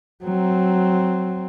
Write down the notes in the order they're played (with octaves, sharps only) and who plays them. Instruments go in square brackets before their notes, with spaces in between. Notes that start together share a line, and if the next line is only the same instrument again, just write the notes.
[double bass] F#3 C4